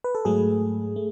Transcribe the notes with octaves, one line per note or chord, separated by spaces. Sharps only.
B4
A4
G#2 F#3 A3 G#4
A3